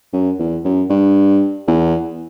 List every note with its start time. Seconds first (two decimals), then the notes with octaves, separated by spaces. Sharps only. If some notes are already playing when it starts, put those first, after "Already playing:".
0.13 F#2
0.39 E2
0.64 F#2
0.90 G2
1.67 E2